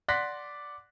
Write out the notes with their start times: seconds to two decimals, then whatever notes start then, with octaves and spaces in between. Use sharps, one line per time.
0.08 D5 F#5 C6 F#6 A#6 B6